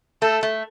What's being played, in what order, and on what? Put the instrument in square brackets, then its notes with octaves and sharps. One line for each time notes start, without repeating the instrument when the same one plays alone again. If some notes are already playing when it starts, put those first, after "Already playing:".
[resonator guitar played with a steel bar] A3 [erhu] A4
[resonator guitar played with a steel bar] A3